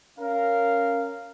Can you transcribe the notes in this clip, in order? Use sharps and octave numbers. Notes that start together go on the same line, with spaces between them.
C#4 A#4 F5